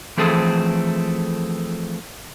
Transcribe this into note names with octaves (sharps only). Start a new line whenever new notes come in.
E3 F3 A3 C4 G#4 A4